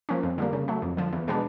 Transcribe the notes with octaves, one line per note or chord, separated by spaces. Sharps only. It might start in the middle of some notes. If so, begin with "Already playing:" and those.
F3 A#3 C#4
F2
D3 G3 A#3
C#3
F#3 A3
F2
D3 F3
E2
B2 G#3 B3 D4